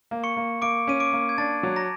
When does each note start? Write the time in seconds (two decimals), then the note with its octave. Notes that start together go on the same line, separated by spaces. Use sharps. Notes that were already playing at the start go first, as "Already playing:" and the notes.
0.11 A#3
0.24 C#6 C#7
0.37 A#3
0.62 A#3 D6 D7
0.87 C#4 D#7
1.00 D6 D7
1.13 A#3
1.29 G#6
1.38 D4 A5 A6
1.63 F#3
1.76 A#5 A#6